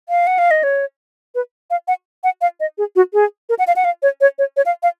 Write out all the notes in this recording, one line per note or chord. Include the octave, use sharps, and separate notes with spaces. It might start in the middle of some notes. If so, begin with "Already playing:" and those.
F5
F#5
F5
D#5
C#5
B4
F5
F#5
F#5
F5
D#5
G#4
F#4
G#4
A#4
F#5
F5
F#5
F5
C#5
C#5
C#5
C#5
F5
F5